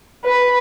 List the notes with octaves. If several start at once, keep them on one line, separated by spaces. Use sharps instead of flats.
B4